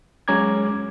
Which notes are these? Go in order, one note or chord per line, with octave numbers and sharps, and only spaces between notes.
F#3 G#3 C#4 A#5 D6 G#6